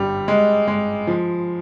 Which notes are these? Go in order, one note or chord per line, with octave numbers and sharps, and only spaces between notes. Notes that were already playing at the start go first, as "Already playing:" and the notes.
Already playing: G1 G3
G#3
G#3
F3